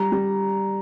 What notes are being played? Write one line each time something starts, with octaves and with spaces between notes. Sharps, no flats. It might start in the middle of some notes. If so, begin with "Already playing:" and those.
Already playing: G3 A#5
G3